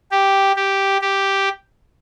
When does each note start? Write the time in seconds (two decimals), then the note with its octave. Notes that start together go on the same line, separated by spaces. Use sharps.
0.11 G4
0.56 G4
1.02 G4